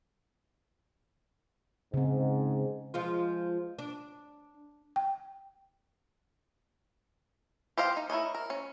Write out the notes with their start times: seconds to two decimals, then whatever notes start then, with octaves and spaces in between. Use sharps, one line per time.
1.94 G#2 C#3 C4
2.94 F3 G#3 F4
3.79 D4
4.96 G5
7.77 G4 C5 D#5 F5
7.97 D#4
8.10 E4 A#4 C#5 D#5
8.35 A#4
8.50 C#4